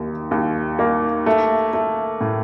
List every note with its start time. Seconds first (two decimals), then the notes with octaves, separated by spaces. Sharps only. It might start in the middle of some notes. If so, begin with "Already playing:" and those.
Already playing: D#2 D#3
0.31 D#2
0.79 A#3
1.26 A3
1.73 A3
2.21 A2